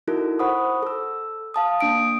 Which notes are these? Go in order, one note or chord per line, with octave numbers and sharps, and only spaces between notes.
D#4 E4 F#4 A4 A#4
C5 F#5 B5 C#6 D#6
A4 E6
F5 A5 D#6
A#3 D4 D#6 D7